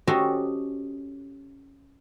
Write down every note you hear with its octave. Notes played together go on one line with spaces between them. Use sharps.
C#4 F#4 G4 A4 C5 D#5